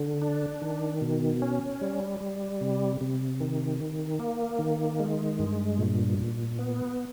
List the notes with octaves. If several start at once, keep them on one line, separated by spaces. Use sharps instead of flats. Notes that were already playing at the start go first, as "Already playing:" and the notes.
Already playing: D3
D4
D#3
B2
C#4
G3
G3
C3
C3
D#3
D#3
A#3
D#3
G#3
G2
A#2
A#2
B3